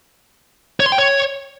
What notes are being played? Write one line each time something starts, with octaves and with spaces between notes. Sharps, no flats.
C#5
C6
G5
C#5